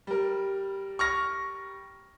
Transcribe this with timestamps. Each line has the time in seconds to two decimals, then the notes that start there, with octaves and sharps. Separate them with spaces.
0.07 G3 A#4
0.99 C#6 F6 A#6